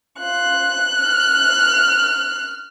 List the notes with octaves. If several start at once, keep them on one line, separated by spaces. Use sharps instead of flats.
F4 F#6
F6